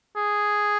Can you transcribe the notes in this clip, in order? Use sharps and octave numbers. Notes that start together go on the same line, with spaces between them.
G#4